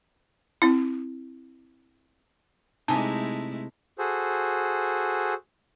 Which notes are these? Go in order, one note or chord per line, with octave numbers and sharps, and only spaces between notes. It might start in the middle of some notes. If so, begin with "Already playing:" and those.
C4 E4
C3 G#3 A3 D#4 E4 G#5 A5
F#4 G#4 A4 C5